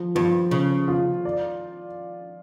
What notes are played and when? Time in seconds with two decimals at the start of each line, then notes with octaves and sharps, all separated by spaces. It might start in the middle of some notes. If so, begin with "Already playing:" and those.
Already playing: F3
0.15 G2 F3
0.51 C#3 C#4
0.88 F4
1.25 D5